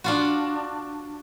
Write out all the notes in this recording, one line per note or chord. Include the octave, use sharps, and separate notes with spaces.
D4 F4 F#4